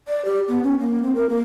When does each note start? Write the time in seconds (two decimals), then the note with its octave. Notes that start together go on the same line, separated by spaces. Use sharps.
0.08 D5
0.25 G4
0.48 B3
0.63 C#4
0.80 A#3
1.03 C4
1.15 A#4
1.30 A#3